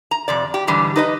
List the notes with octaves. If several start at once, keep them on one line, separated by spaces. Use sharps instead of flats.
A#5
F2 C3 D5
G4
G#2 D3 E3 G3
D#4 B4 D#5